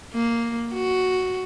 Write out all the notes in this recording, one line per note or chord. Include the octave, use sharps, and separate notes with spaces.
A#3
F#4